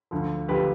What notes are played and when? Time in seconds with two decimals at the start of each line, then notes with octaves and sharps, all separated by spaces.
0.11 D2 D3 F3
0.48 D2 D3 F3 G4 B4